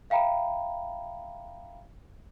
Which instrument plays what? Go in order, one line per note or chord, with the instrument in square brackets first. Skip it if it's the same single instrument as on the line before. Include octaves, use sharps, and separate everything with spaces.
[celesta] E5 F5 G5 A#5 B5